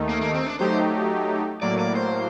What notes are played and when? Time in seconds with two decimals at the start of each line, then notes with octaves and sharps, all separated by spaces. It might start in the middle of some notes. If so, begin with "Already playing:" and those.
Already playing: D#2 D#3 A3 D#4
0.09 A#3
0.21 A#3
0.34 C4
0.46 D4
0.59 F#3 A3 D#4 G4 C5
1.62 A2 F#3 A#3 D5
1.79 D5
1.95 C5